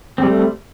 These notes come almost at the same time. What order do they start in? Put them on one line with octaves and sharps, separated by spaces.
C4 G3 A3